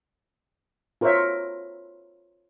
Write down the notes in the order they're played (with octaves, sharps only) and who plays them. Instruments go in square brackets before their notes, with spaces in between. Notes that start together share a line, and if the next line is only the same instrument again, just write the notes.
[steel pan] F4 A#4 C5 C#5 E5